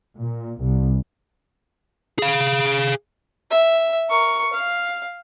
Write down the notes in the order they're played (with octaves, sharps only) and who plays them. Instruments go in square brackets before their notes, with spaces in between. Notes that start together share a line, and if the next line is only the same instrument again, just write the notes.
[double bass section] A#2
C2
[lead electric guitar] G#4 F5
[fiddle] E5
A#4 C#6
F5